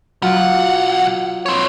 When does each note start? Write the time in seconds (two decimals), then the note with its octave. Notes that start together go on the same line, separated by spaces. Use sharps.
0.22 B1 F#3 F4 F#5 D6
1.46 C4 C#5